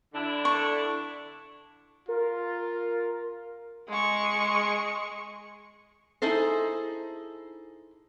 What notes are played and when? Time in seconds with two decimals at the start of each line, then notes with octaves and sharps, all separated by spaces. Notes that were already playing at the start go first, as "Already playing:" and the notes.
0.14 D3 D4 E4
0.45 C#6
2.09 F4 A#4
3.89 G#3 C#6
6.22 D#4 E4 G#4 A4 C5